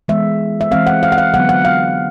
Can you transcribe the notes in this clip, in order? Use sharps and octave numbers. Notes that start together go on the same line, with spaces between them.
E3 G#3 B3 E5
E5
E3 G#3 C4 F5
F#5
F5
F#5
F5
D3 F#3 B3 F#5
F#5
F5